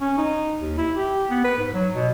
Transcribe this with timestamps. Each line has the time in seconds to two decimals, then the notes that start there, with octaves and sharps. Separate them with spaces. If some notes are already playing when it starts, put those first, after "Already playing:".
0.01 C#4
0.18 D#4
0.60 D#2
0.78 E4
0.96 G4
1.30 B3
1.44 B4
1.58 G#2
1.74 F#3
1.94 B2